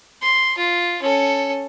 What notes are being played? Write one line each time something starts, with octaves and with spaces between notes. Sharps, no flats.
C6
F4
C#4 A4